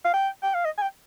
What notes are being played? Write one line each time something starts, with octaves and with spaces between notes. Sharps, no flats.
F5
G5
G5
F5
D#5
G#5
G5